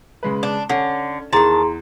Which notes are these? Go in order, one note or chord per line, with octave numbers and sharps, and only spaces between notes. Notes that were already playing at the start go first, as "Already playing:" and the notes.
C#3 G#3 B4
D4
D3 C#4
E2 D#3 G#4 A5 A#5 C6